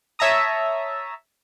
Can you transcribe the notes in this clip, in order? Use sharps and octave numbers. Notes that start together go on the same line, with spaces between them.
C#5 E5 A5 A#5 D#6